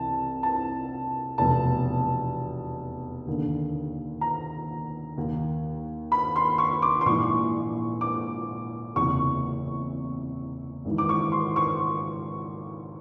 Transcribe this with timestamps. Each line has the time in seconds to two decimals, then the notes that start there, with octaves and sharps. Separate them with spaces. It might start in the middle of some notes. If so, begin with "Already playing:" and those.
Already playing: C2 C3 E3 A5
0.43 A5
1.38 F1 E2 B2 A5
3.27 D#2 D3
4.21 A#5
5.16 D#2 D#3
6.12 B5
6.36 C6
6.58 C#6
6.82 D6
7.01 C6
7.06 A#1 G#2 E3 C#6
8.01 D6
8.95 F#1 E2 C3 C#6
10.85 G#1 G#2 E3
10.98 D6
11.09 C#6
11.32 C6
11.56 C#6